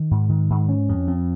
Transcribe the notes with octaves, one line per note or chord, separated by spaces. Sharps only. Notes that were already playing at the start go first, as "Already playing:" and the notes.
Already playing: D#3
G#2
D#3
G#2
C#4
F2
F2